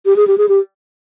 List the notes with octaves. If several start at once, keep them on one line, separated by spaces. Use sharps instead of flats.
G4
G#4
G4
G#4
G4